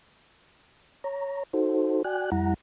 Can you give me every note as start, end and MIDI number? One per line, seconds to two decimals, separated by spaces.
1.04 1.43 73
1.04 1.43 82
1.53 2.03 63
1.53 2.03 66
1.53 2.03 69
1.53 2.03 72
2.04 2.30 66
2.04 2.30 74
2.04 2.30 79
2.04 2.30 80
2.04 2.30 90
2.32 2.54 41
2.32 2.54 55
2.32 2.54 64
2.32 2.54 78
2.32 2.54 82